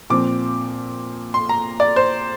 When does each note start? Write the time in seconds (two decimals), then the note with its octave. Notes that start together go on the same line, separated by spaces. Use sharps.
0.10 A#2 F3 C4 D6
1.34 C6
1.49 A#5
1.80 D5
1.96 C5